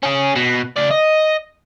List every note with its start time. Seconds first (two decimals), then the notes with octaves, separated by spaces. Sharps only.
0.03 C#4 G#4
0.36 B2
0.77 C#3 D5
0.91 D#5